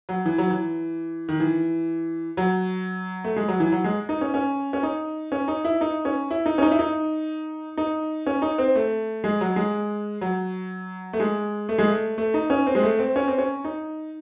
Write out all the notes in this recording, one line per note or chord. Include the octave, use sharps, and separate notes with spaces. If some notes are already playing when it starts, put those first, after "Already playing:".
F#3
E3
F#3
E3
D#3
E3
F#3
A3
G#3
F#3
E3
F#3
G#3
D#4
C#4
C#4
C#4
D#4
C#4
D#4
E4
D#4
C#4
E4
D#4
C#4
D#4
E4
D#4
D#4
C#4
D#4
C4
A3
G#3
F#3
G#3
F#3
A3
G#3
A3
G#3
A3
A3
D#4
C#4
C4
G#3
A3
C4
C#4
C4
C#4
D#4